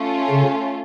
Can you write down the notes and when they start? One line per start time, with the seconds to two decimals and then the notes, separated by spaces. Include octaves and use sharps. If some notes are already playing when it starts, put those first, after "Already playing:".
Already playing: A3 C#4 F4
0.30 C#3